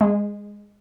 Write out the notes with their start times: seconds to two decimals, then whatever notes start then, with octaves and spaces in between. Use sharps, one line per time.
0.01 G#3